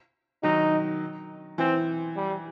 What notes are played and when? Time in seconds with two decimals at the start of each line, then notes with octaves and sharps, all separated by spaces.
0.43 D#3 F#3 D#4
1.58 E3 C4
2.16 G3